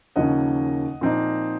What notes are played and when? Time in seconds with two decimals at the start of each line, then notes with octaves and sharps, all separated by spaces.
0.16 D#2 C#3 F3 A#3 C#4 D#5 F#5
1.01 A#2 F3 C4 D#4